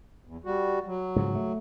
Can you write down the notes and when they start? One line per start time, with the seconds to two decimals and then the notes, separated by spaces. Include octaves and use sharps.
0.25 E2
0.45 G3 F#4
0.86 F#3
1.16 G#2 C#3 F3
1.35 A3